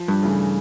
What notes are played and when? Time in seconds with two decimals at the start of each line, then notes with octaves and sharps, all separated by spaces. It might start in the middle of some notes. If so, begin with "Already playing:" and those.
Already playing: F3
0.08 G2
0.23 C#3 E3 A3